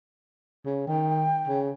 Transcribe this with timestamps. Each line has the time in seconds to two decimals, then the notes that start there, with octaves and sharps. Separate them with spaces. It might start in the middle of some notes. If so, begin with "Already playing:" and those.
0.66 C#3
0.88 D#3 G5
1.48 C#3